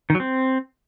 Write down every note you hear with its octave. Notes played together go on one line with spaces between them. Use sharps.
D#3
F#3
C4